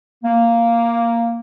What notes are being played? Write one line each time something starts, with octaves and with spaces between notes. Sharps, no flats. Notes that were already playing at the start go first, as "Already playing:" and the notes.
A#3